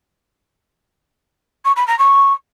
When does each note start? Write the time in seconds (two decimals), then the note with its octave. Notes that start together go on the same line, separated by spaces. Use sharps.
1.65 C#6
1.76 B5
1.87 A#5
1.99 C#6